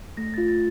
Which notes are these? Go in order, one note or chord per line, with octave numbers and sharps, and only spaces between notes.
A3 A#6
F4 A6
A6